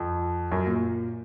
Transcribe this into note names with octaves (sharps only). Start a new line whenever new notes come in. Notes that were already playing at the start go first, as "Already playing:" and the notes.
Already playing: F2
F#2
A#2